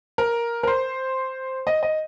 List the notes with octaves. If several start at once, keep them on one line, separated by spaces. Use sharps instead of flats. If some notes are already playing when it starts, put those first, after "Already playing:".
A#4
A#4
C5
D#5
D#5